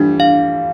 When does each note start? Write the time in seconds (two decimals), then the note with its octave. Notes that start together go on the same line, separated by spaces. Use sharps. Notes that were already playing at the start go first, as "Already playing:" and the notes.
Already playing: E3 F3 G3 A3 D4
0.20 F5